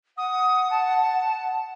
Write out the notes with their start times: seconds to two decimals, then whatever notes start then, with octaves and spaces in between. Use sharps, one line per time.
0.17 F#5 D#6
0.70 A5